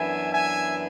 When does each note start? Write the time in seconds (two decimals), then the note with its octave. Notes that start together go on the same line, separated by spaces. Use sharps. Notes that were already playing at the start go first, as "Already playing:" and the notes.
Already playing: F#2 E3 B3 D4 E5 G#5
0.33 E5 G#5